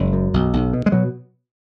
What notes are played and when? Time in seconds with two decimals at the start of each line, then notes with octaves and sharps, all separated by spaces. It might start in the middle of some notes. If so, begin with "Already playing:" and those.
Already playing: F#1 G#3
0.13 F#2
0.34 B1
0.53 B1
0.73 B2
0.86 G#3
0.92 B2 F#3